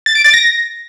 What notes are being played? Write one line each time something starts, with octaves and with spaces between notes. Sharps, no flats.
A6
D7
A6
A#6